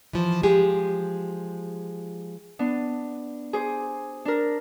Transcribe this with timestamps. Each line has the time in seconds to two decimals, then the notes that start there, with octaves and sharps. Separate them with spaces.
0.13 E3 F3
0.43 F3 G#3 G4 G#4
2.59 B3 D4
3.53 G#4 C5 D6
4.25 D4 A#4